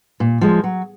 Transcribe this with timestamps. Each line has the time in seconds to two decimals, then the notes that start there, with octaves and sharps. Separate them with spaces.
0.20 A#2
0.41 F3 G#3
0.64 F#3